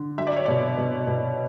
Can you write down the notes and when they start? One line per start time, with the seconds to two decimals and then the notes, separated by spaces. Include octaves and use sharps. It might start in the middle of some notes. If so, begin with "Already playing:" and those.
Already playing: D3
0.18 F#3 E5
0.27 D5
0.36 C#5
0.46 B2 D5
0.77 B2
1.07 B2